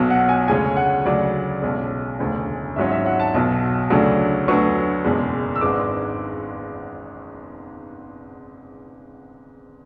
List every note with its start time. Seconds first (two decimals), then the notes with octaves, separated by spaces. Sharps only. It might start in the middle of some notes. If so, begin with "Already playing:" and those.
Already playing: B1 B2 F#3
0.10 F#5
0.29 G#5
0.48 D2 C#3 G#3 C#4 G#5
0.76 F#5
1.05 D2 C#3 F#3 D5
1.62 B1 B2 G#3 C#4
2.19 E1 D2 C#3
2.76 G#1 G#2 F#3 C#4 E5
2.92 E5
3.06 F#5
3.20 A5
3.34 B1 B2 F#3
3.90 D2 C#3 F#3 A3 D4
4.48 D2 D3 F#3 B3 C#6
5.05 F#1 E2 B2 G#3
5.56 E6
5.61 G#1 G#2 G#3 B3 D4 D6